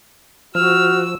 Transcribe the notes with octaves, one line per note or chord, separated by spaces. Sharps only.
F3 F#4 E6 F6